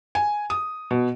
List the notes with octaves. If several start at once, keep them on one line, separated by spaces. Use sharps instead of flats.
G#5
D#6
B2